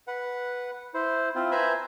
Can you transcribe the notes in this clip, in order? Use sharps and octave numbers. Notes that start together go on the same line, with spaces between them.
B4 F#5
E4 C5
C4 E4 F4
B4 C5 E5 G#5 A#5 B5